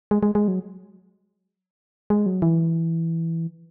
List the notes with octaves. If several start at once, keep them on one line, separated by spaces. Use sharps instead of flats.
G#3
G#3
G#3
F#3
G#3
F#3
E3